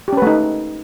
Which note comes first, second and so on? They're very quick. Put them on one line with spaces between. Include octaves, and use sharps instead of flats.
G4 C#4 B4 A3 D#4